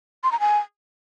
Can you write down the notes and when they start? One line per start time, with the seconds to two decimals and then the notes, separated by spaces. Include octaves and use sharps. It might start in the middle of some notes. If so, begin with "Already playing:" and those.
0.23 C6
0.32 A#5
0.40 G#5